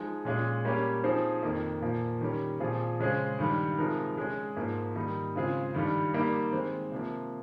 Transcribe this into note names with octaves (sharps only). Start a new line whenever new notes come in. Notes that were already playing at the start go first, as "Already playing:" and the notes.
Already playing: F3 G#3 D#4 G#4
A#2 G#3 C#4 F4 G#4
G3 A#3 C#4 G4 C#5
F3 C4 D#4 G#4 C5
F2 D#3 A#3
A#2 F3 A#3
D#3 G3 C#4 G4 A#4
A#2 F3 C4 F4 G#4
C#3 G#3 C#4 G#4 C5
G2 D#3 G3
C3 F3 G#3 D#4 A#4
G#3 C#4 G#4
G#2 F3 A#3 D#4
D#3 G3 A#3 D#4
C#3 G#3 C4 F4 G#4
G2 D#3 G3
G3 A#3 D#4 G4
D#3 G#3 C4
C3 F3 A#3